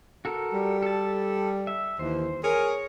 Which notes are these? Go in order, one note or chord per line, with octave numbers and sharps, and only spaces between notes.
F#4 A4 A#4
G3
A4 A5
E5
D#2 E3 C5
G#4 A#4 C#5